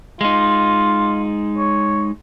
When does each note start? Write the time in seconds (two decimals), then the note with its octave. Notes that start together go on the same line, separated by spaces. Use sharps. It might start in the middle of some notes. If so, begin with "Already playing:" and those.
0.21 G#3 D#4 F4
1.57 C#5